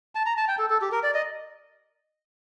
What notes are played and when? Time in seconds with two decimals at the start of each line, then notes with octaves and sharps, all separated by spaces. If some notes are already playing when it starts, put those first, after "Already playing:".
0.15 A5
0.26 A#5
0.37 A5
0.48 G5
0.59 A4
0.70 A4
0.81 G4
0.92 A#4
1.03 D5
1.14 D#5